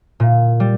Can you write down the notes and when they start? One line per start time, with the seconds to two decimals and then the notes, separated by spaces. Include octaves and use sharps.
0.20 A#2
0.60 G3